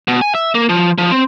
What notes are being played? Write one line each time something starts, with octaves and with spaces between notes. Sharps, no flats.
B2
G#5
E5
A#3
F3
F3
C4